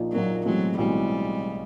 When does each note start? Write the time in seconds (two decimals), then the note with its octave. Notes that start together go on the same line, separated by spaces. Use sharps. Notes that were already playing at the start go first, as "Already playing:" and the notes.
Already playing: A#1 A#2 F3 A#3 D#4
0.12 A#1 A#2 F3 F#3 A#3 D#4
0.45 B1 A2 E3 F#3 G#3 C4
0.78 B1 A2 E3 G3 G#3 C4